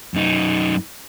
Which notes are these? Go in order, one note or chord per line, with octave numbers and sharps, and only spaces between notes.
F#2 D#4